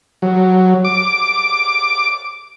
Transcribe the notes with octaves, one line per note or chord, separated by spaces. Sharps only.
F#3
D6